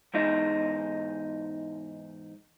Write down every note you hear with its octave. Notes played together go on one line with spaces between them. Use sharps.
E2 G#2 D#4